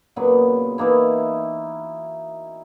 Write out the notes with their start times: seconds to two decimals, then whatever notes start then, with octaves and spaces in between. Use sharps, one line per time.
0.16 A#2 C#3 F#3 B3
0.78 E3 A#3 D#4 E4